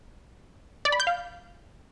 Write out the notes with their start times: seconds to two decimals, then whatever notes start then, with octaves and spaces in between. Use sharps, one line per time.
0.85 D5
0.92 B5
1.00 G6
1.07 F5